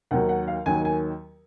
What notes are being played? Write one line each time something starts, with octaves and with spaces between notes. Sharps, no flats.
D#2 D#3 F#3 F#5
F#5
F5
D#2 D#3 F#3 G#5
G#5